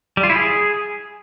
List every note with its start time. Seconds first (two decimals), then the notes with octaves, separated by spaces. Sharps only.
0.17 G3
0.23 F4
0.30 E4
0.36 G#4